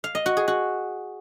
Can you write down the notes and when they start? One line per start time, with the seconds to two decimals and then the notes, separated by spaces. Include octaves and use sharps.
0.04 F5
0.15 D#5
0.26 F#4
0.37 G#4
0.48 F#4